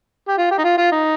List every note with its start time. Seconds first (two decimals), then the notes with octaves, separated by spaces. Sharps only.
0.29 G4
0.38 F4
0.51 G4
0.58 D#4
0.64 F4
0.77 F4
0.92 D#4